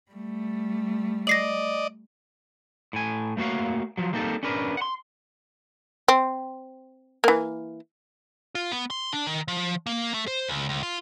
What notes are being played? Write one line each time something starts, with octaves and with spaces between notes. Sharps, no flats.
G3 A3
D5 D#5 A#6 C7 F#7
A2 G#5
A3 A#3 F#4 C#5 F5
F3 F#3
G3 A#3 C4 D#4 A4
C#4 D4 A#4 B4
F#5 C6
C4
E3 A#3
F4
B3
C6
D4
D#3
F3
A#3
A3
C5
C#2
C#2
F4